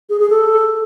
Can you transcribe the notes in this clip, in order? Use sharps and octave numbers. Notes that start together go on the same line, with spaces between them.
G#4
G#4
A4